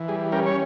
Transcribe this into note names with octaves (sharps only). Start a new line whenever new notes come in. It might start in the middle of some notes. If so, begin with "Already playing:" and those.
Already playing: E3
G3 G#4
C#4 G4 A#4
C#5